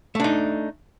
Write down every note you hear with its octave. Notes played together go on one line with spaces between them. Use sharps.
A3 D4 D#4